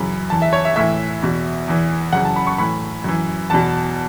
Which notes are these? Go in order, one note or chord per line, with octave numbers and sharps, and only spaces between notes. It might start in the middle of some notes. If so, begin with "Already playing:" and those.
Already playing: F#2 C#3 E3 B5
E2 E3 A5
E5
C#5
E5
A2 E3 E5
E2 B2
E2 E3
F#2 C#3 E3 F#5
A5
B5
C#6
A2 E3 B5
F#2 E3
E2 B2 A5